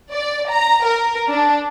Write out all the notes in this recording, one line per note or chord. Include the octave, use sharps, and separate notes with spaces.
D5
A#5
A#4
D4